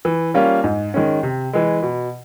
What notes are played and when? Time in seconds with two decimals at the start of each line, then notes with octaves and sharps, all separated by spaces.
0.05 E3
0.34 G3 A#3 C#4 F4
0.64 G#2
0.94 D#3 G#3 C#4
1.23 C3
1.53 E3 G#3
1.83 B2